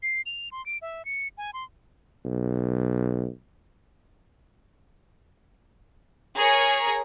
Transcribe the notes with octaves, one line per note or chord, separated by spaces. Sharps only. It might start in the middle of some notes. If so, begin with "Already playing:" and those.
C7
F7
C6
D7
E5
C#7
G#5
C6
B1
G#4 A#4 C#5 A#5 C#6